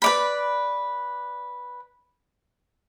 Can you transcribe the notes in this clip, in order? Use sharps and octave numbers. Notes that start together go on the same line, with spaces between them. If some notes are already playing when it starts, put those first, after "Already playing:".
B4 D5 B5